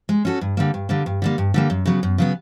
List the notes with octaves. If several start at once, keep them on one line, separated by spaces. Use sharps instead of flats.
G#3
C#4 F#4 A4
G2
D3 G3 A#3
G2
D3 G3 A#3
G2
D3 G3 A#3
G2
D3 G3 A#3
F#2
C#3 F#3 B3
F#2
C#3 F#3 B3